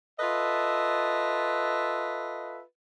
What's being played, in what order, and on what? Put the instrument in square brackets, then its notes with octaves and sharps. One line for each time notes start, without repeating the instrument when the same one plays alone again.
[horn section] F4 A4 B4 D#5 E5